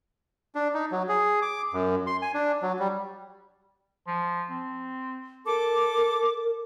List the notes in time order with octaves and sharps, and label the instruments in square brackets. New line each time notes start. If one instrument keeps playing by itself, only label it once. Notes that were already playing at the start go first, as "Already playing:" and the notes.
[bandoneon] D4
D#4
F#3
G#4
D6
F#2
C6
G#5
D4
F#3
G3
[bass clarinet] F3
C4
[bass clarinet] A4 [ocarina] A#4 [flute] D6